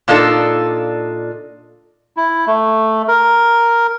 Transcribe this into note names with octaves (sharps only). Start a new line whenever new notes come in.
A#2 D4 D#4 F4 A4
E4
A3
A#4